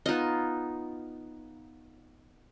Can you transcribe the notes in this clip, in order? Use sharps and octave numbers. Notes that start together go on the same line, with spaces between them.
B3 D#4 F4 D#5